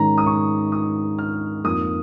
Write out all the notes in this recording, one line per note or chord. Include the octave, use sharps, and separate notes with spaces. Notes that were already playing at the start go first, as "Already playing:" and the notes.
Already playing: G#2 D#3 G#3 C#4 A#5
D#6
C#6
D#6
F6
F2 F3 A#3 D#4 D#6